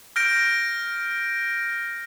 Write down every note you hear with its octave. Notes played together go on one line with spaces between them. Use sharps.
F6 G6 A#6 D7